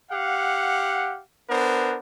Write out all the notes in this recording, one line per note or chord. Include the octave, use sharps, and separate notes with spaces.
G4 F5 F#5
B3 D4 A#4 C5